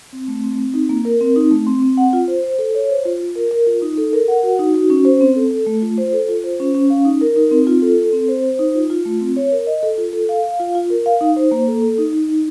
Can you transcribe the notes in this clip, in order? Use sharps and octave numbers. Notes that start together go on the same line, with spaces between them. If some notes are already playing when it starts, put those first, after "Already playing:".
C4
A3
C4
C4
D#4
A#3
A#4
C4
D#4
A3
C4
C4
F#5
F4
C5
C5
A4
C#5
C5
F4
F4
A#4
A#4
F4
D#4
A4
A#4
F#5
F#4
D#4
F#4
C#4
C5
C4
A4
A4
A3
F4
C5
A4
F4
C5
C#4
C#4
F5
D#4
A#4
D#4
C4
F4
A4
A4
C4
C5
C5
D#4
F4
F4
A3
C4
C#5
A#4
D#5
A4
F4
A4
F5
F5
F4
F4
A#4
F5
D#4
C5
A#3
A4
A4
D#4
D#4
D#4